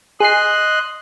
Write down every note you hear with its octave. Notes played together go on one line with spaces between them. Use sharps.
G#4 D#5 C6 F#6 C7